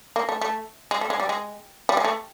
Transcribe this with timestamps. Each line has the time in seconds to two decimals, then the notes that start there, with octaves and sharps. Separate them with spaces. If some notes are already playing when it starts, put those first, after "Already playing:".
0.16 A#3
0.29 A3
0.41 A3
0.91 G#3
1.01 A3
1.10 G#3
1.20 G3
1.29 G#3
1.89 G3
1.97 G#3
2.05 A3